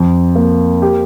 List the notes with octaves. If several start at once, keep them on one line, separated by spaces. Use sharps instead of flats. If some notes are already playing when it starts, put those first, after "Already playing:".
Already playing: F2
A#3
G4